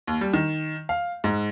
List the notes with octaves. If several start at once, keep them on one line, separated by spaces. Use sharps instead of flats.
D#2
G3
D#3
F5
G#2